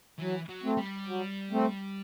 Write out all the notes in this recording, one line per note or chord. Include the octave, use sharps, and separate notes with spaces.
E3 F#3
F#3
A3 C4
G3
F#3
A3 C4